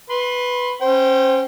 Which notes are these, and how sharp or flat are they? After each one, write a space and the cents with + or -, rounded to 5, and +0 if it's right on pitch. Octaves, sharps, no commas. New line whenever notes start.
B4 +0 C6 +25
C#4 -30 C5 +0 G5 -25